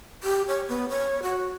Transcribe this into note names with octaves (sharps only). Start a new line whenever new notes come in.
G4
C#5
B3
C#5
F#4